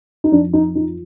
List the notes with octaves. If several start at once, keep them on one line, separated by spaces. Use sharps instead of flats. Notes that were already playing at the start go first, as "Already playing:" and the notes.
D#4
F2 D4
D#4
F3 D#4